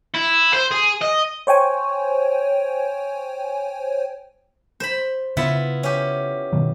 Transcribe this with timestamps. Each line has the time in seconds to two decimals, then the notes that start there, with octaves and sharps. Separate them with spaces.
0.14 E4
0.54 C5
0.71 G#4
1.01 D#5
1.47 C5 C#5 G5 G#5
4.80 C5 B5
5.37 C#3 B3 E4 F4
5.83 C#4 G4
6.53 B2 D#3 F#3